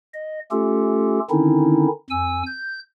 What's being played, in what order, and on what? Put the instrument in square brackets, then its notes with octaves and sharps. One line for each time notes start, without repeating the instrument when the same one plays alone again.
[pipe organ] D#5
A3 C#4 F4 G4 A4
D3 D#3 C4 C#4 D#4 E4
F2 G#5 E6
G6